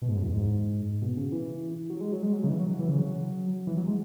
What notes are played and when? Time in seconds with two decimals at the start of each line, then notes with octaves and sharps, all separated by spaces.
0.02 B2
0.08 G#2
0.16 F#2
0.23 E2
0.33 G#2
1.02 B2
1.17 C#3
1.32 E3
1.90 F#3
2.01 G#3
2.12 F#3
2.23 G#3
2.33 F#3
2.44 C#3
2.49 E3
2.60 F#3
2.79 E3
2.88 C#3
2.98 F#3
3.67 E3
3.77 F#3
3.87 G#3